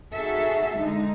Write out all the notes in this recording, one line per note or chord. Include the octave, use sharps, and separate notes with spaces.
D#4 F#4 G#4 A4 E5
D3 G#3 D#4